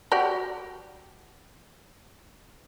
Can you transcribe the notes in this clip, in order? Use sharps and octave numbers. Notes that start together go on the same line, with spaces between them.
F#4 G4 D5